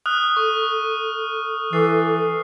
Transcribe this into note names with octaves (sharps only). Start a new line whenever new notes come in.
D#6 F6 F#6
A4 C#6
E3 A4 C7